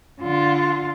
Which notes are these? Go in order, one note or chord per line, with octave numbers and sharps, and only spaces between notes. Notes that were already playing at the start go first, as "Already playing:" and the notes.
D3 F4